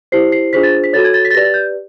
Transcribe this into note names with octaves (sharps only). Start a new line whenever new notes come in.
E4 G4 C5 C7
C7
D4 F4 G#4 C5 B6
A6
B6
F#4 A4 C#5 A6
G#6
A6
B6
A6
G4 B4 D5 A#6
A6
G6